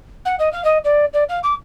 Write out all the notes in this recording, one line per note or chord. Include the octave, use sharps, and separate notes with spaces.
F#5
D#5
F5
D#5
D5
D5
F5
D6